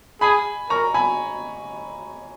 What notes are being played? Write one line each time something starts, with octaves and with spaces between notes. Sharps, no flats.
G#4 G#5 B5
A#4 A#5 C#6
G#5 B5